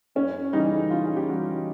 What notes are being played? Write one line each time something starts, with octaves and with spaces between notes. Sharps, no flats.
F#2 C#4
C#3 E3 G3 D#4
F#2 F4
G#4
G4
C#3 E3 G3 F#4